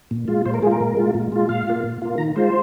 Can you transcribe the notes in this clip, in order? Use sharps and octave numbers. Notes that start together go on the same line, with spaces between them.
A#2
G#3 F4
A#2 C5
A#4
G#3 F4 G#4 A#4
A#2
G#3 F4
A#2
G#3 F4
A#2 F5
A#3 F4
A#2
A#3 F4
D#3 A#5
G#3 F4 C5